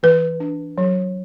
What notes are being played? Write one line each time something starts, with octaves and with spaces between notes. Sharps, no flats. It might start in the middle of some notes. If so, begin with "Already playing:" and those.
E3 B4
D4
F#3